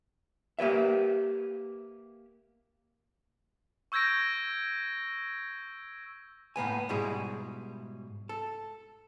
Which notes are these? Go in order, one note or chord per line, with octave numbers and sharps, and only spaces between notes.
A#3 G4 B4 E5
C#6 E6 G6 G#6 A#6 D7
A2 A#3 B3 G#5
G#2 B2 G3 E4 G#4
A4